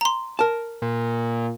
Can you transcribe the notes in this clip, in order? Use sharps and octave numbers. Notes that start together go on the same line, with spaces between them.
A#5 C6
A#4 A5
A#2